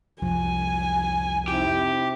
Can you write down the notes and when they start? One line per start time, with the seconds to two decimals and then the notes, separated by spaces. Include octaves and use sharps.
0.22 C2 F2 F3 G#5
1.48 C3 D#4 E4 G4